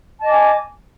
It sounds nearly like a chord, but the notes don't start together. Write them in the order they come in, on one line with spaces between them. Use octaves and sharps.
A5 D#5 D6 G#5